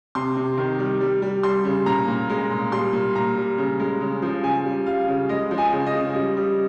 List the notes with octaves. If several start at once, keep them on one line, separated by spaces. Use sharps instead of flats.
C3 C6
C3
D#3
G3
G3
G3
G3 C6
C#3
A#2 A#5
A#2
G#3
A#2
G3 C6
A#2
A#2 A#5
G3
C#3
G#3
C#3
F3
C#3 G#5
G3
G3 F5
C#3
G#3 D#5
F3
G#5
C#3
D#5
C#3
G3
G3